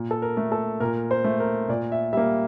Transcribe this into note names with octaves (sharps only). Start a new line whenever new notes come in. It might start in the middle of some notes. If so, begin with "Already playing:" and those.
Already playing: A#2
A4
A#4
A3
A4
A#2 A#4
C5
A3
A#4
A#2 D5
E5
G3 A#3 E5